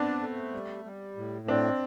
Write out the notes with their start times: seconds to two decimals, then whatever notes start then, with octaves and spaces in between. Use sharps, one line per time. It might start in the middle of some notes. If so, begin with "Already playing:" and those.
Already playing: B3 C4 D4
0.21 A3
0.53 G3
0.85 G3
1.17 A2
1.48 C4 D4